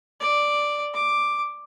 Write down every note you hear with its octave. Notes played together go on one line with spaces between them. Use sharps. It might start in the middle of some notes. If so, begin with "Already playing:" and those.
D5
D6